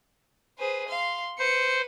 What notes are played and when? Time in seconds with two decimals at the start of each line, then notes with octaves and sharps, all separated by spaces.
0.59 G#4 B4 C5
0.89 F5 C6
1.39 B4 C5 C#7